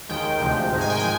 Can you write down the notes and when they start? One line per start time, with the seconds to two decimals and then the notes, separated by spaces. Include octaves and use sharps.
0.09 D#2 D#3 G#3 G5
0.40 D2 C3 F3 G#3
0.71 G#2 D#3 G#3
0.81 G#5
0.90 G5
0.99 F3 G#3 G#5